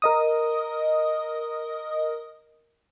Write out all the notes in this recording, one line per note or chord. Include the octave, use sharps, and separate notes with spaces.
A#4 D#5 D#6